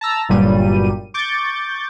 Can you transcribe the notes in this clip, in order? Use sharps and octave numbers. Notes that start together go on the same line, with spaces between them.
A5 A#5 E6 A#6
G1 G2 A#2 F#3 G3 D#7
C#6 D6 G6 A6